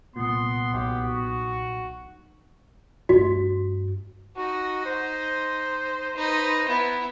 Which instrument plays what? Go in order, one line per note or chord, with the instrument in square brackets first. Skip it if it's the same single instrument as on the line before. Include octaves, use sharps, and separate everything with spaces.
[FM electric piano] C2 A#2 [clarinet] B3 [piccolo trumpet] C6
[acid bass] B1 [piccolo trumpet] G4
[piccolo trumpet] F#4
[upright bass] G2 A3 [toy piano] F#4
[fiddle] D#4 [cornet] F#4
[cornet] C5
[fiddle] D#4 B4
B3 E4